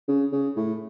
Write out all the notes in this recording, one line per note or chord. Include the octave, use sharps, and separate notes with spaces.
C#3
C#3
A2